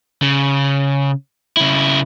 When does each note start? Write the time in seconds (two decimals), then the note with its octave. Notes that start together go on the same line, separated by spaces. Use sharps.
0.22 C#3
1.57 C#3 E4